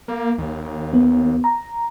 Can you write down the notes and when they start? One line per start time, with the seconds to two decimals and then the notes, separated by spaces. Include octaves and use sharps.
0.08 A#3
0.38 D#2
0.93 B3
1.44 A#5